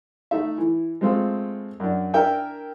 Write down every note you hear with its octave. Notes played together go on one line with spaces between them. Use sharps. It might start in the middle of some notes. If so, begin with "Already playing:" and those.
A3 D#4 E5
E3
G#3 A3 C4 F4 A4
F#2 D4
D4 A#4 E5 G5 G#5